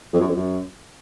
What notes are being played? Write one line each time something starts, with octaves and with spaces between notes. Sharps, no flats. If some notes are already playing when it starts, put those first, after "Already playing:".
F2
F#2
F2
F#2